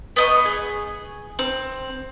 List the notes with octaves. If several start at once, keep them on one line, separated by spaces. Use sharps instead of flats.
B3 D#5 C#6
G#4
C4